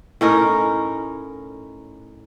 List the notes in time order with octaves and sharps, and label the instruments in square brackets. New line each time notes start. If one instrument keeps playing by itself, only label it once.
[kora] A2 C#4 D#4 A#4